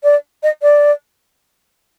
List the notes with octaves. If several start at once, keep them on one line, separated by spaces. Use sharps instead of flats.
D5
D#5
D5